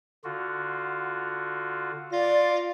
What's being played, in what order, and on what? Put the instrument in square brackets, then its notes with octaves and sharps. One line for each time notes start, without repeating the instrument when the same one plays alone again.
[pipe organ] D3 F4 F#4
[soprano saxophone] F4 [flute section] D5 [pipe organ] A#6